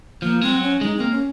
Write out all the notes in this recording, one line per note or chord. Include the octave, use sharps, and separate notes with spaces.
F3 A#3
G#3 C4
F#3
C#4
G#3 D#4
A#3 C4
C#4